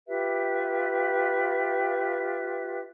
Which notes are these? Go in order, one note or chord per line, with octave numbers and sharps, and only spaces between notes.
F4 G4 B4 E5